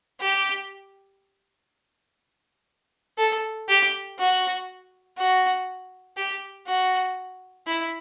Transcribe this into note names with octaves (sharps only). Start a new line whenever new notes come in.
G4
A4
G4
F#4
F#4
G4
F#4
E4